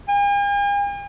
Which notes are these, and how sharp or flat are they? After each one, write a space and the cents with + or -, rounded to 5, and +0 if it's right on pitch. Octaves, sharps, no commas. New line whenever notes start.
G#5 -45